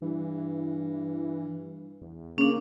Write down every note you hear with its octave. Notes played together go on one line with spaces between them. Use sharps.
G2 E3
E2
C#3 A#3 C#4 D4